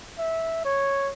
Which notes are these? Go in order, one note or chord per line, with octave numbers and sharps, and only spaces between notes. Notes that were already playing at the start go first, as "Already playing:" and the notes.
E5
C#5